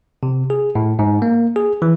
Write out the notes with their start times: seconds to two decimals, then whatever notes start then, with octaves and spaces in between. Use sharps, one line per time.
0.23 C3
0.50 G#4
0.75 A2
0.99 G#2
1.22 A#3
1.56 G#4
1.82 E3